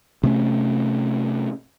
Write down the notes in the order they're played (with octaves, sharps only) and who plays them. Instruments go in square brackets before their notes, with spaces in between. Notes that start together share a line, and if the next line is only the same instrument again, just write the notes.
[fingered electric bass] C3 A3 C#4